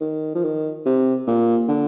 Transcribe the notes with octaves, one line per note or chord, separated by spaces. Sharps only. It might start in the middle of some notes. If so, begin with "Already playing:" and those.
D#3
F3
D#3
C3
A#2
D3